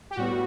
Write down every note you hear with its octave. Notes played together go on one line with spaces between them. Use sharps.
G4
A2 G3 B3 F#4